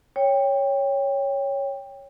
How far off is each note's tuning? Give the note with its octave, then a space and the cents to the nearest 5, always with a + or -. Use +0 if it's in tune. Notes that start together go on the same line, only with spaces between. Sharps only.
C#5 +0 G5 +15